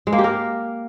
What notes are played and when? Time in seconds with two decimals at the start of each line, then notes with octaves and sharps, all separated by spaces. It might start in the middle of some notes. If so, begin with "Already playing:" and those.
0.07 G#3
0.13 A#3
0.18 G4
0.24 A#4